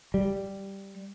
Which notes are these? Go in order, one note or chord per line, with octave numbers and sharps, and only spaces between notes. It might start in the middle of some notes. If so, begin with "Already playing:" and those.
G3